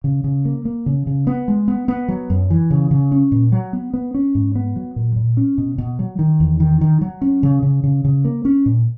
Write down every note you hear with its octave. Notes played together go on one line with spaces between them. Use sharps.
C#3
C#3
A#3
A#3
C#3
C#3
B3
G#3
B3
B3
F#3
F#2
E3
C#3
C#3
C#4
A#2
F#3
B3
B3
C#4
G#2
B3
F#3
A#2
A#2
C#4
B2
B2
F#3
D#3
E2
D#3
D#3
F#3
C#4
C#3
C#3
C#3
C#3
A#3
C#4
A#2